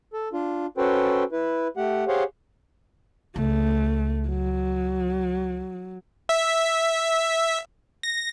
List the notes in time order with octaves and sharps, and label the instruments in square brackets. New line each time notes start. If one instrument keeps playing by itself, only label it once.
[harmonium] A4
D4 F4
C#4 F#4 A4 B4 C5 G5
E4 B4
A3 G4 F#5
G4 G#4 C5 C#5 F5 F#5
[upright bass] C#2 [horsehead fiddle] A3
[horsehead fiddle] F#3
[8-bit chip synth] E5
A#6